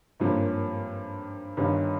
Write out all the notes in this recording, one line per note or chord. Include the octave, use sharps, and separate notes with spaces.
G#1 G2 F3 A#3 C#4
G1 G2 D#3 G3 C#4